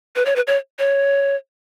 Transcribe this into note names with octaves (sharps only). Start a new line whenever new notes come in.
B4
C#5
B4
C#5
C#5